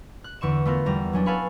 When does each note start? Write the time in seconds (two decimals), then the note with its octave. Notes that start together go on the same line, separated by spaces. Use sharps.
0.24 F#6
0.41 E2 D3 C#6 E7
0.66 A3 B3 F4 A#4
0.86 E2 G3 A#5
1.13 F#3 C#4 D4
1.26 A4 B4 F5 G#5 B5 C#6